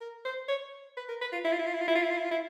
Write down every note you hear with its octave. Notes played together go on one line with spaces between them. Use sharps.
A#4
C5
C#5
B4
A#4
B4
F4
E4
F4
E4
F4
E4
F4
E4
F4
E4
F4
E4
F4
E4